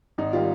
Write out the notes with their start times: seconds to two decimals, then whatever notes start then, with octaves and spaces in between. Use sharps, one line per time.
0.18 G#1 D#4
0.33 D#3 G3 F4